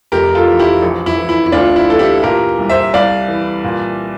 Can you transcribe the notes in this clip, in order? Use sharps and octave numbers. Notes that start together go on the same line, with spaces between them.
F1 G4 A#4
F4 A4
E3
E4 G4
A#1
E4
E3
E4
E4
D2 D4 F4
E4
E3 A4
E4 G4
A#2 G4 A#4
C2
C5 E5
C2 D5 F5
E3
A#2